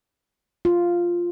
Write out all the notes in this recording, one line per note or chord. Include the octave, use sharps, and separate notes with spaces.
F4